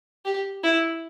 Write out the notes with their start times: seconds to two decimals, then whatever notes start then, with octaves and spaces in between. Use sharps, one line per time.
0.25 G4
0.63 E4